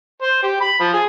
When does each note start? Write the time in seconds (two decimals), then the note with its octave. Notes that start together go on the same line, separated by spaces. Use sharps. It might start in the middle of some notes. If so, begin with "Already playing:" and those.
0.22 C5
0.43 G4
0.61 B5
0.80 F3
0.93 G#4